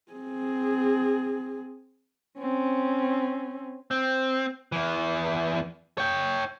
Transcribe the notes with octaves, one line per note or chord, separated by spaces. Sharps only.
C4 G#4
C4 C#4
C4
E2 E3
C#5 G5